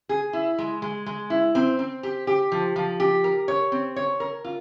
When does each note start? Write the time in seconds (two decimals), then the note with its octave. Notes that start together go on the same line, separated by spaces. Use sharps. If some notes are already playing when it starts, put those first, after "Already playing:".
0.09 G#4
0.33 E4
0.58 G#3
0.82 G#3
1.06 G#3
1.30 E4
1.55 C4
1.79 C4
2.03 G4
2.27 G4
2.52 F3
2.76 F3
3.00 G4
3.24 A#4
3.48 C#5
3.72 C4
3.96 C#5
4.20 A#4
4.44 F4